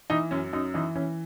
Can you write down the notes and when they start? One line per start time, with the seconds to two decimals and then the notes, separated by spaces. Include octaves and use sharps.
0.10 E3 D#4
0.31 F#2 C#4
0.53 F#2 D#4
0.74 E3 D#4
0.95 E3 C#4